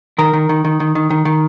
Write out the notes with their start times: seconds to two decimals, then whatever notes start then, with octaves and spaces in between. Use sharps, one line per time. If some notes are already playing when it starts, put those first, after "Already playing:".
0.18 D#3 A#4
0.33 D#3
0.49 D#3
0.65 D#3
0.80 D#3
0.95 D#3
1.10 D#3
1.25 D#3